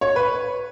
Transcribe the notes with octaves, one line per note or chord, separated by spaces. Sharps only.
C#5
B4